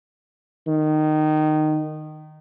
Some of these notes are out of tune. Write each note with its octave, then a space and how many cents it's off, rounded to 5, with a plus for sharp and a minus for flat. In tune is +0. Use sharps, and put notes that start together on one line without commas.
D#3 -15